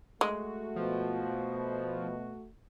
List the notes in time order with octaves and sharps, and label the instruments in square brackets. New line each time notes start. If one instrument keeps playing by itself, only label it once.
[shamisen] G#3 [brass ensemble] A3 F#4
[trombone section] B2 [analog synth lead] F3